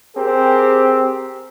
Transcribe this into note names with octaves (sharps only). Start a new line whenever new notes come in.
C4 G4 G#4 A#4